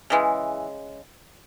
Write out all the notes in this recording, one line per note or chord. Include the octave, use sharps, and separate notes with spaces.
C#3 E3 G#3